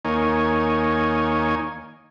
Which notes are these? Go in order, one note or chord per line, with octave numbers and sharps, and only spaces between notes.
D#2 A#3 D#4 C#5 G#5